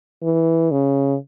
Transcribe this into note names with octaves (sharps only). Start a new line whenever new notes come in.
E3
C#3